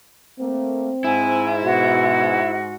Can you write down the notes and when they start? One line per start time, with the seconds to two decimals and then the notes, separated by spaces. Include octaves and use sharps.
0.39 A3 A#3 C4
1.04 G#2 E4 G#5
1.64 B2 F#4